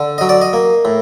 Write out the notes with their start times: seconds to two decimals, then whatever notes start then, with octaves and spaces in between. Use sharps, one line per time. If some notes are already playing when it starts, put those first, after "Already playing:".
Already playing: D3
0.18 F#3 D#5
0.29 D5
0.41 D#5
0.53 A#3
0.85 A2